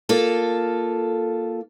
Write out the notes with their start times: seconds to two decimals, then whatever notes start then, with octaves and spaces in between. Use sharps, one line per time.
0.09 A#3 F4 A4